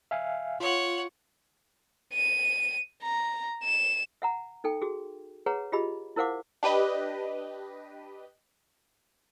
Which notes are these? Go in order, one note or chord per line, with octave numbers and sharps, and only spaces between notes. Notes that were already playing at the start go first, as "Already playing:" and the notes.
E5 F5 G#5
F4 C#5 F#5
D#7
A#5
E7
E5 F#5 A#5
D#4 A4 G5
F#4 G#4
G#4 B4 C#5 F#5 A#5
F4 G4 G#4 D#5 E5 B5
E4 A#4 C5 F5 F#5 D6
D4 G4 B4 D#5